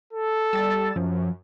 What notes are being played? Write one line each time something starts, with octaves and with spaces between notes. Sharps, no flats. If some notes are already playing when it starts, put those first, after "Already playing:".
A4
G3 E6 A6
F#2 F3